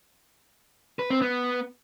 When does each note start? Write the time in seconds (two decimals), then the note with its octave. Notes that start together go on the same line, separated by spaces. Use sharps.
0.99 B4
1.10 C4
1.22 B3